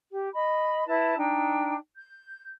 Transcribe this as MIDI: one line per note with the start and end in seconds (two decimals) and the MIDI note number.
0.12 0.28 67
0.32 0.85 75
0.32 0.85 83
0.86 1.16 64
0.86 1.16 71
0.86 1.16 81
1.16 1.75 62
1.16 1.75 63
1.16 1.75 79
1.96 2.48 91